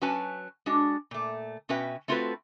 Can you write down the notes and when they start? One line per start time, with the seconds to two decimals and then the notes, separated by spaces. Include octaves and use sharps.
0.02 F#3 C#4 F#4 B4 G#5 A5
0.66 G#3 D4 F#4
1.11 A#2 A3
1.69 B2 C#4 F#4 B4 E5 G5
2.08 A3 C4 F4 F#4 A4 B4